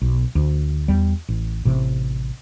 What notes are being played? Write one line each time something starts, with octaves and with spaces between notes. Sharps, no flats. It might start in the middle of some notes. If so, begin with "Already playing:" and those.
B1
D2
E2 G3
A1
A1 C3